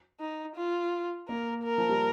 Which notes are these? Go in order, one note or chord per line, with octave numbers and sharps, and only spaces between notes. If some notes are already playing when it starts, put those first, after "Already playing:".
D#4
F4
A#3 A#4
A#4
F3
G3